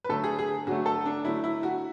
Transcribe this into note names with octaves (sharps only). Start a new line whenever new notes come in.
B4
D3 F#3 A3 A4
G#4
G#4
D3 F#3 A3 F#4
A4
D4
D3 F#3 A3 E4
E4
F#4